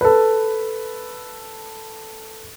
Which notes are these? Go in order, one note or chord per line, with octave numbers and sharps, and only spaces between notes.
A4 B4